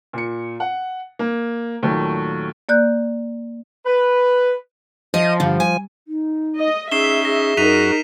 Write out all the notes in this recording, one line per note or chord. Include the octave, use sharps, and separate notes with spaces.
A#2 C#7
F#5
A#3
D#2 A#2 F#3 A3
A#3 D5 F#6 G6
B4
F3 D#5
G2 D3
G#5
D#4
D#5
C#4 D#4 G#4 E5 C7 E7 G7
G#4 A#6
F#2 D#4 F#4 A#4 B6 D#7 F7